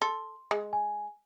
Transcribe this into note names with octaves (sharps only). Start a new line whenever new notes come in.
A4 C6
G#3
G#5